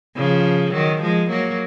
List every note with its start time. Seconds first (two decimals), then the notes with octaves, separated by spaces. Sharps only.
0.16 C#3 F3
0.73 D#3 F#3
1.01 F3 G#3
1.30 F#3 A#3